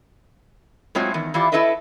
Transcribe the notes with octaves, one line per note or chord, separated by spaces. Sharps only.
A2 F#3 G#3 C4 F4 C#5
E2 D#3
E3 E4 F4 G4 D5
E4 G4 A4 B4 D#5 E5